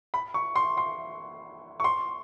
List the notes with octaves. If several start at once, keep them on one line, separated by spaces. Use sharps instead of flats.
B5
C#6
C6
C6
C#6
C6